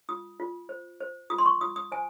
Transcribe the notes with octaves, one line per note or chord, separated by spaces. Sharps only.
F4 D#6
F4
C5
C5
F4 D#6
C6
C#6
F4 D#6
D#6
C5 G#5